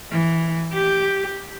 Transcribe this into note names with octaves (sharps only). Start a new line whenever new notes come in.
E3
G4